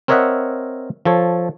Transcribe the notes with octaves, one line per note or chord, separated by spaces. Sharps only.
C4 A#4 C#5 D#5 E5 F#5
F3 A4 C#5